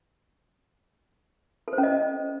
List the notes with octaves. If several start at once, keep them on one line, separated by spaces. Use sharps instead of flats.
A4
C5
C#4
D#5